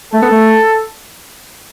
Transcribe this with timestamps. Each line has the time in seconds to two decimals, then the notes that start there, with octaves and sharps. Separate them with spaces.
0.13 A3 A4
0.22 B3
0.31 A3